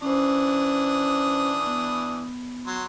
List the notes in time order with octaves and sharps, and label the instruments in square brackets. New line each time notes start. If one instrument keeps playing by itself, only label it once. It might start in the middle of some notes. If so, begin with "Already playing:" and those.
[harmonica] E3 D4 D#6 [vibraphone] C#4 C5
[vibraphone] B3
[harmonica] F#3 C6